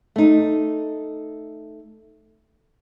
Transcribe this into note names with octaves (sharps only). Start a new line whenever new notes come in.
A3 D#4